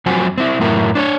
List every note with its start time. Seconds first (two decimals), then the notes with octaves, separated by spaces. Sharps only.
0.06 F2 F#3 C4 G#5
0.38 C4 E4
0.60 F#2 A2 E4 A#4
0.95 D4 C5 C#5